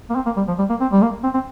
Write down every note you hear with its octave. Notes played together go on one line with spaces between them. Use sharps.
A#3
C4
A#3
G3
F3
G3
A#3
C4
G3
A#3
C4
C4